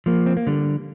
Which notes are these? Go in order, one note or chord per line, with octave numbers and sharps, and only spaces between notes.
F3 A#3
C4
A#3
D3 G3